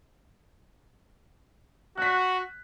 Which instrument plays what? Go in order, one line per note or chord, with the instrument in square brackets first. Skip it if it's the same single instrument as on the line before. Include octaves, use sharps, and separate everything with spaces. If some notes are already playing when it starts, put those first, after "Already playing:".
[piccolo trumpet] F#4 [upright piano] F#6 B6